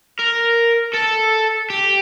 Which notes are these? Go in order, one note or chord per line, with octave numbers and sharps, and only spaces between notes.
A#4
A4
G4